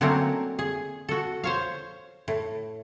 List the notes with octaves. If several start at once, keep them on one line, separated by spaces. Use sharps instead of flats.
D3 F#3 A3 A#3 C4 C#4
G#4
F#4 A4
C5 C#5 F5
A2